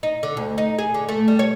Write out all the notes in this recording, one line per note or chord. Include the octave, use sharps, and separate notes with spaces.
D#4
D3
D2
D#4
G#4
D3
A3
G3
C#5